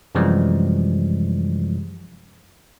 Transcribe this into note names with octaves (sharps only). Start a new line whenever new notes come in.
F#2 C3 E3 F3 G3 G#3